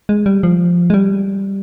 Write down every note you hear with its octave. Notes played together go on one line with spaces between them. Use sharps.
G#3
G3
F3
G#3
G3